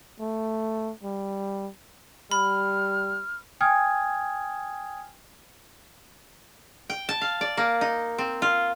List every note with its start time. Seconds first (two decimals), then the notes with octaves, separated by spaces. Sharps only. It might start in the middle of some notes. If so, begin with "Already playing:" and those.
0.20 A3
1.03 G3
2.31 G3 B5 F6
3.61 G5 G#5 D#6 F6 G#6
6.90 G5
7.09 A5
7.21 F5
7.41 D5
7.57 A#3
7.81 D#4
8.18 C4
8.42 F4